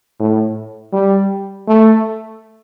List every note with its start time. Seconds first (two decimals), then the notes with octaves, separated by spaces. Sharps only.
0.19 A2
0.92 G3
1.68 A3